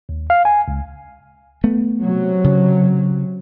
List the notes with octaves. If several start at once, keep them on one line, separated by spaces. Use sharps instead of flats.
D#2
F5
G#5
C#2
A3 B3
C3 F#3
C#3